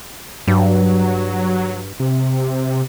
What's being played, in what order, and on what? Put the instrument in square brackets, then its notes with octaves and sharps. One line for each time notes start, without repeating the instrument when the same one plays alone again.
[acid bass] G2 [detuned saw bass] F#3
[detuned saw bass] C3